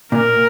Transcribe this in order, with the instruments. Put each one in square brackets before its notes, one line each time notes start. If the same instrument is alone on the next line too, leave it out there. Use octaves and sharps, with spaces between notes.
[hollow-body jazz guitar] A#2 [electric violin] A#4